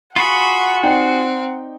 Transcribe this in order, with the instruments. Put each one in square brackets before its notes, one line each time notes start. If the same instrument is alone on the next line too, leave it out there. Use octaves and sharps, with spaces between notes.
[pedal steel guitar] F4 F#4 G#4 [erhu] F#5 [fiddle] B5 C#6
[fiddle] C4 [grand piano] D#4 D5 G5